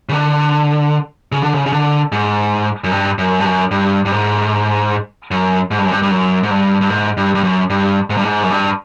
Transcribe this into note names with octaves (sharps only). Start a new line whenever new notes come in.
C#3
D3
C#3
D3
C#3
C#3
D3
G#2
F#2
G2
F#2
G2
F#2
G2
G2
G#2
F#2
G#2
G2
F#2
G2
G2
F#2
G#2
G2
G2
G#2
G2
G2
F#2
G2
G#2
G2
G#2
F#2
G2